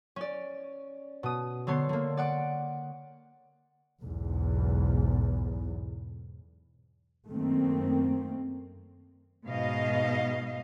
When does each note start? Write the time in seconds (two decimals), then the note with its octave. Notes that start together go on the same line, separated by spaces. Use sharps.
0.16 C#4 D5
1.23 B2 D#6
1.67 D3 B3 C#5 C6
1.89 D3 A#3
2.17 D5 F#5 D6
4.02 B1 E2 G#2
7.28 F#2 D#3 A3 A#3 C4
9.47 G#2 B2 D#5 F5